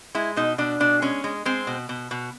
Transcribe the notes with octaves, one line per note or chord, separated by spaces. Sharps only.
G#3 E4
B2 D#4
B2 D4
B2 D4
G#3 C#4
G#3
G#3 C4
B2
B2
B2